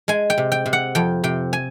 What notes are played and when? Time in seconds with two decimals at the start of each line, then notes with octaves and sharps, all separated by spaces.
0.08 G#3 G#5
0.30 G5
0.38 C3
0.52 G5
0.66 C3
0.73 F#5
0.95 F2 G5
1.24 C3 G5
1.53 G#5